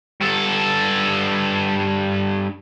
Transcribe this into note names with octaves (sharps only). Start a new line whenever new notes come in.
G2 A4